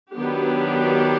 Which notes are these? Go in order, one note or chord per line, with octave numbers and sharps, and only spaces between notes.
D#3 F#3 B3 D4 G4